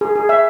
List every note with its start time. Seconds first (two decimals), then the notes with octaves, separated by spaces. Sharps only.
0.01 G#4
0.15 G#4
0.29 E5